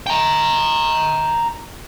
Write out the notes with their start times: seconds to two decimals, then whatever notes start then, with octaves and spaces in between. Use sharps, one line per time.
0.07 G5 A#5